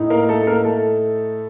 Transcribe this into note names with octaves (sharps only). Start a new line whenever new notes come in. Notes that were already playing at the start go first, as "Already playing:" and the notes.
Already playing: A2 D#4
A#3 A#4
A3 A4
A#3 A#4
A3 A4